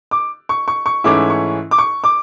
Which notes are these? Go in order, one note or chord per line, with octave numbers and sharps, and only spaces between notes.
D6
C#6
C#6
C#6
G#2 E3 A3 C#4 E4 D6
C#6
D6
C#6
D6